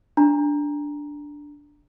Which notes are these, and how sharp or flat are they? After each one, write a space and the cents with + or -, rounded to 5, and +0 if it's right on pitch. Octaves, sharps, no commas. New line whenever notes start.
D4 +0 A#5 +0